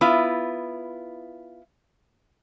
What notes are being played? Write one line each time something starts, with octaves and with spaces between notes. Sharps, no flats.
B3 E4 F4